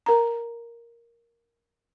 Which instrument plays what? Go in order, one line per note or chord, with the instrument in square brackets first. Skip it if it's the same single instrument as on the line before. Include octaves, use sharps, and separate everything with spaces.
[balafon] A#4 A#5